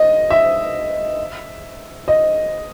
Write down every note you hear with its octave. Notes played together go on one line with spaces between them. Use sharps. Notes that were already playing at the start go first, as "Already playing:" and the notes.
Already playing: D#5
E5
D#5